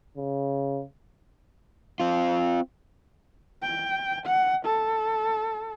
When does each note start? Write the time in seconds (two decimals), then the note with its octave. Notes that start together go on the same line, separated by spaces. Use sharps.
0.17 C#3
2.00 C4 F4
3.63 G5
4.26 F#5
4.65 A4